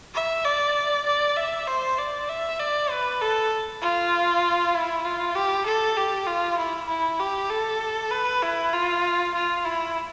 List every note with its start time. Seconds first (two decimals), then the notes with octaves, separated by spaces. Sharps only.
0.14 E5
0.45 D5
1.06 D5
1.37 E5
1.68 C5
1.98 D5
2.29 E5
2.59 D5
2.90 B4
3.21 A4
3.82 F4
4.74 E4
5.05 F4
5.35 G4
5.66 A4
5.97 G4
6.27 F4
6.58 E4
6.89 E4
7.20 G4
7.50 A4
8.11 B4
8.42 E4
8.73 F4
9.34 F4
9.65 E4